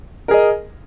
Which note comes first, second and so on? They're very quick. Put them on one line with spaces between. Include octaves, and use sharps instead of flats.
A#4 G#4 D#5